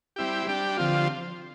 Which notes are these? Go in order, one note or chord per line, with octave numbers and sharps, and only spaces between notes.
G3 C4 E4 G4
G3 D4 G4
D3 F3 C4 F4